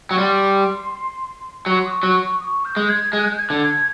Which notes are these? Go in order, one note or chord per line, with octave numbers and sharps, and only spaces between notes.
F#3 C#6
G3 C6
F#3 C#6
C6
D#6
C#6
F#3
D#6
C#6
G6
G#3
G#6
G#3 F#6
G6
G#6
D3
G#6